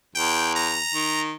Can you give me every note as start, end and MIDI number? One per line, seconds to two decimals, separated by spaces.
0.15 0.80 40
0.15 0.53 79
0.56 1.21 82
0.93 1.34 51